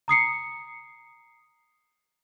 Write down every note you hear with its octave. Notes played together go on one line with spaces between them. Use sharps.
A#5 D#6 C7 C#7